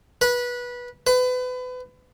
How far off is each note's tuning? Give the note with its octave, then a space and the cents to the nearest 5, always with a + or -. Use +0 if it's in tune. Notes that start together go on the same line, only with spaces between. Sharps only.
B4 -20
B4 +30